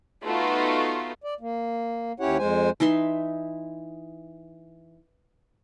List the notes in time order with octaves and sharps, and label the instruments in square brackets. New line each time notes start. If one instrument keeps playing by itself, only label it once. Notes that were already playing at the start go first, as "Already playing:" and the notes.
[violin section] A3 B3 D#4 F4 F#4 A4
[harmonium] D5
A#3
D#2 C#4 E4 G4 C#5 F#5
F2 G#3 C5 G#5
[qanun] E3 D#4 E5 C6